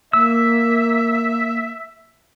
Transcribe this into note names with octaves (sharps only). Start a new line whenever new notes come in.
A#3 E5 E6